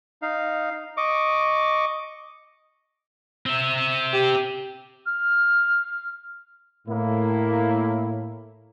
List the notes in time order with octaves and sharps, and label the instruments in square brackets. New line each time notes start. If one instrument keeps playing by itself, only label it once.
[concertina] D#4 F5
D#5 C#6 D6
[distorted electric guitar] C4 E5
[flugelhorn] G4
[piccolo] F6
[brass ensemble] A2 [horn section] A#3 E4